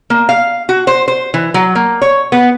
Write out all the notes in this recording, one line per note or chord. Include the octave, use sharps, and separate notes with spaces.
A#3
F5
F#4
C5
C5
E3
F#3
A#3
C#5
B3